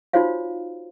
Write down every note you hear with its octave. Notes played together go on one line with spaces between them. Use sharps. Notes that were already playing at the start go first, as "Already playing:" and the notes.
D#4 F4 F#4 C5 C#5 F5